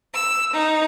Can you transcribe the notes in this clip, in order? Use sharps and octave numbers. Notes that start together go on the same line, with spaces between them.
E6
D#4